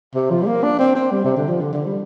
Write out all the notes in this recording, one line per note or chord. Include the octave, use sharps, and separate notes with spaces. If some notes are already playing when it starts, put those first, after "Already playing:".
C3
F3
G3
A#3
D4
C4
C4
G3
C3
D3
F3
D3
D3
G3